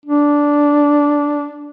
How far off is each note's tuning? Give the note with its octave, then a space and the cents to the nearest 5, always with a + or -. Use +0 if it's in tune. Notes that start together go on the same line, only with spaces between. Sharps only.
D4 -10